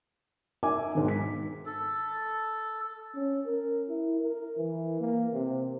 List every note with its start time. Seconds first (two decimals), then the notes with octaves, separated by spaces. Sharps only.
0.63 D#4 A#4 E5 G#5 D6
0.95 B1 G#2 D#3
1.08 B6
1.66 A4
3.15 C#4
3.46 A#4
3.89 E4
4.21 A#4
4.57 E3
5.00 A#3
5.33 C3